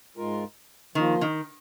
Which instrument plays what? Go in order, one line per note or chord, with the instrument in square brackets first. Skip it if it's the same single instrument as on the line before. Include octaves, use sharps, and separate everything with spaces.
[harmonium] G#2 G#3 F4 A#4
[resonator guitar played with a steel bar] D#3 [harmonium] F3 A#3 F4
[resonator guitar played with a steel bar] D#3